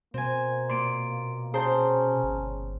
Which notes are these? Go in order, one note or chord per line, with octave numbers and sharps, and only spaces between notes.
B2 A#3 C4 G#5
A#2 C6 D7
C#4 G#4 C5 G5 A5 A#5
G1